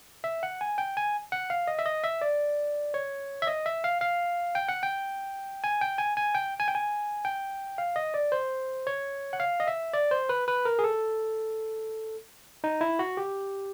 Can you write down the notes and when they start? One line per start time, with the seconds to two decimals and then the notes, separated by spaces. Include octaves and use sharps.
0.24 E5
0.43 F#5
0.61 G#5
0.78 G5
0.97 G#5
1.32 F#5
1.50 F5
1.67 D#5
1.79 E5
1.86 D#5
2.04 E5
2.21 D5
2.94 C#5
3.42 E5
3.47 D#5
3.66 E5
3.84 F5
4.01 F5
4.55 G5
4.68 F#5
4.83 G5
5.64 G#5
5.81 G5
5.98 G#5
6.17 G#5
6.35 G5
6.60 G#5
6.68 G5
6.75 G#5
7.25 G5
7.78 F5
7.96 D#5
8.14 D5
8.32 C5
8.87 C#5
9.33 F#5
9.40 F5
9.60 D#5
9.68 E5
9.93 D5
10.11 C5
10.29 B4
10.48 B4
10.65 A#4
10.79 G#4
10.84 A4
12.64 D#4
12.81 E4
12.99 F#4
13.17 G4